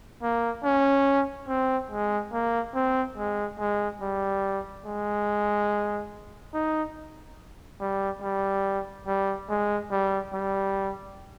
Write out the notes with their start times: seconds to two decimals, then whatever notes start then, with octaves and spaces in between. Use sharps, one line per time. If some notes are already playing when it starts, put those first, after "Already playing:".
0.22 A#3
0.64 C#4
1.48 C4
1.91 G#3
2.33 A#3
2.75 C4
3.17 G#3
3.59 G#3
4.01 G3
4.85 G#3
6.54 D#4
7.81 G3
8.22 G3
9.07 G3
9.49 G#3
9.91 G3
10.33 G3